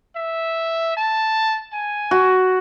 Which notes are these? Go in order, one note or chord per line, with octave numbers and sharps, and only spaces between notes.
E5
A5
G#5
F#4